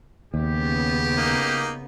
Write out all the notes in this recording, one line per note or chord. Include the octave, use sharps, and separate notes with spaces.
D#2 C#3 B3 G4
A#3 D#4